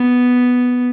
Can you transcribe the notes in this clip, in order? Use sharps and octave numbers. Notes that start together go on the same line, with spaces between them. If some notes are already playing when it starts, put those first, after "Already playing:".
Already playing: B3